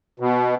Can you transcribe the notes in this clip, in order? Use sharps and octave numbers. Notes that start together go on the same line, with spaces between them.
B2